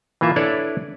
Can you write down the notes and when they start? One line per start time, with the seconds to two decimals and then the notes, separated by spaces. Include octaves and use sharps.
0.21 E3 A#3 F4 E5
0.36 D4 E4 A4 B4 C#5 D5